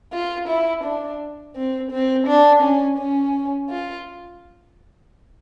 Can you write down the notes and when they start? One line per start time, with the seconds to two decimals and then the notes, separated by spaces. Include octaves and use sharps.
0.12 F4
0.48 E4
0.84 D4
1.55 C4
1.91 C4
2.27 D4
2.62 C#4
2.98 C#4
3.69 F4